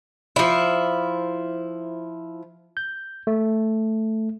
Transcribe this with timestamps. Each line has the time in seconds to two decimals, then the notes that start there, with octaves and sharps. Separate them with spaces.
0.36 F3 E4
2.77 G6
3.27 A3